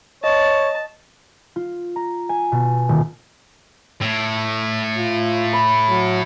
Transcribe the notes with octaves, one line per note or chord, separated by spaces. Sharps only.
C#5 D#5 A5
F4
A#5
G#5
B2
D#1
A2
F4
B5
F#3